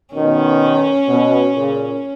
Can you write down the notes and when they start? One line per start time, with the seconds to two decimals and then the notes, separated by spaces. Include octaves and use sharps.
0.14 B2 D#3 C#4
1.08 B2
1.55 A#2 C#3